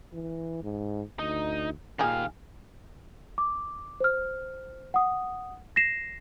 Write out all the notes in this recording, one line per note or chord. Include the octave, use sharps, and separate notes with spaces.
E3
G#2
D2 D#4
A#2 D#3 D#4 G4 G#4 F5
D6
C5 F6
F#5 D#6
A#6 C7 E7